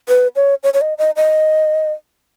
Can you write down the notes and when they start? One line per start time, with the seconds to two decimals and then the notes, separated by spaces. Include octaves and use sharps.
0.09 B4
0.36 C#5
0.63 C#5
0.74 C#5
0.81 D#5
0.98 D#5
1.16 D#5